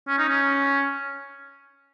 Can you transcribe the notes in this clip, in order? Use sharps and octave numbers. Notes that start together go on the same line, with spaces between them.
C#4
D#4
C#4